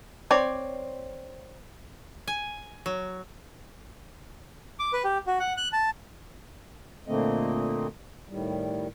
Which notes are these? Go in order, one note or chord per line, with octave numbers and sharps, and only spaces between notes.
C4 C#5 D5
G#5
F#3
D6
B4
G4
F#4
F#5
F#6
A5
A#2 D3 A3 A#3 C4 D#5
A2 D#3 G3